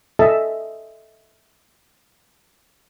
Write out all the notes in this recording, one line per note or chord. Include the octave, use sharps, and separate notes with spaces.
A4 D#5 E5 G#5 A5